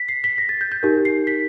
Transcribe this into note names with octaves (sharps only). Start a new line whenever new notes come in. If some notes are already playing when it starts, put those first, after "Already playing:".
Already playing: B6
C7
B6
A#6
A6
G6
G6
D#4 G4 A#4
C7
B6